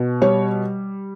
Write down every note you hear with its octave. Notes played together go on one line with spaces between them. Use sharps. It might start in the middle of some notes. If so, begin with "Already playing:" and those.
Already playing: B2
G3 C#5